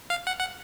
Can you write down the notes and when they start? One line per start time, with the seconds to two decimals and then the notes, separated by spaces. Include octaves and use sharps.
0.10 F5
0.27 F#5
0.40 F#5